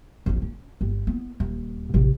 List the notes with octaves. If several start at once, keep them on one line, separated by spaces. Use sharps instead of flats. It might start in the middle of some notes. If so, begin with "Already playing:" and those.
A1 F2
C#4
G1
B3 E4
D#1
A1 C3